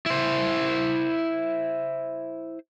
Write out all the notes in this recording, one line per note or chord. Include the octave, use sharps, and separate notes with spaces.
E4 C5